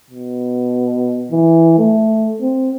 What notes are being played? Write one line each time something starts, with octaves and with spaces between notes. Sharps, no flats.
B2
E3
A3
C4